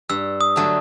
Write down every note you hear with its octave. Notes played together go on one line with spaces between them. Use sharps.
G2 E6
D#6
D3 F#3 A3